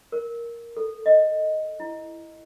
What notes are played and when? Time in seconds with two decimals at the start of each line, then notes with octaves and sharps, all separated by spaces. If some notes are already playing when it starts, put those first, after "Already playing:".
0.12 A#4
0.77 A4
1.06 D#5
1.80 E4